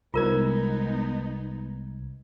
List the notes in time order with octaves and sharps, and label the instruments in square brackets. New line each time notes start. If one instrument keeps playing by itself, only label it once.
[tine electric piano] C2 G#6 [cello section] G#3 B3 D#4 [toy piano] F4 A#4 C5